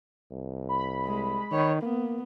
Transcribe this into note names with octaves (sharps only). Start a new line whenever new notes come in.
C2
B5
G#3
D#3 C#5
A#3 B3